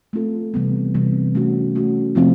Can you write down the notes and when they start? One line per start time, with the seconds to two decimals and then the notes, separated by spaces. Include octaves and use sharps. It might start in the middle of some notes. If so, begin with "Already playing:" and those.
0.13 A3 C4 F4 A4
0.54 C3 E3 G3 B3
0.94 C3 E3 G3 B3
1.35 A3 C#4 F#4
1.75 A3 C#4 F#4
2.15 C3 F3 A3 C4 F4